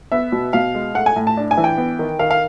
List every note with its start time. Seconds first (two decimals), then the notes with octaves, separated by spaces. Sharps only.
0.12 B3 E5
0.32 B2
0.53 B2 F5
0.75 G#3
0.95 A3 F#5
1.06 G#5
1.16 A2
1.27 A5
1.37 D4
1.51 G#5
1.57 E3
1.64 G5
1.78 B3
1.99 D#3
2.19 D#3 F5
2.31 F5